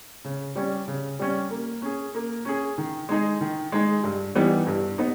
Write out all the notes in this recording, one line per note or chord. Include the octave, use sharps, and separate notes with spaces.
C#3
G3 C#4
C#3
G3 C#4
A#3
C#4 G#4
A#3
C#4 G#4
D#3
G#3 D#4 G#4
D#3
G#3 D#4 G#4
G2
E3 G3 B3 D#4
G2
B3 D#4